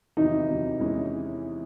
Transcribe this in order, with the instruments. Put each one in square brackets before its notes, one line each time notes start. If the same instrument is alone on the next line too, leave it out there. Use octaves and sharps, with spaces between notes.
[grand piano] E2 C3 D#3 F#3 [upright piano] D#4
[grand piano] E2 C3 D#3 F#3
E2 C3 E3 G#3 C#4